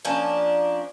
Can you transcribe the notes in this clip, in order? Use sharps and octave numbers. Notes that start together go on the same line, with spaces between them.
F3 A#3 C#4 D4